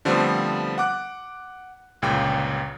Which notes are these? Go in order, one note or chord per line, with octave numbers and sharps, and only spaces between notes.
D3 F3 G3 A3 B3 C4
F#5 D6 F#6
G1 C#2 A#2 C#3 G5